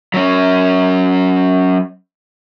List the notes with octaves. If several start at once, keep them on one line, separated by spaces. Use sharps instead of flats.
F#3 C#4